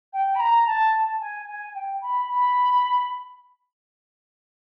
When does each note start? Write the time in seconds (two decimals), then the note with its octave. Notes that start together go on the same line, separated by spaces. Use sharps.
0.13 G5
0.35 B5
0.40 A#5
0.66 A5
1.20 G#5
1.48 G#5
1.74 G5
2.01 B5
2.28 B5